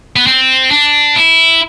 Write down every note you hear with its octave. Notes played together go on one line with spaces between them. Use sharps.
B3
C4
D4
E4